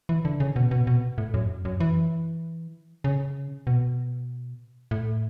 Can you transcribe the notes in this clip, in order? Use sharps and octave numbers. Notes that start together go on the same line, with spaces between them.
E3
D3
C#3
B2
B2
B2
A2
F#2
F#2
E3
C#3
B2
A2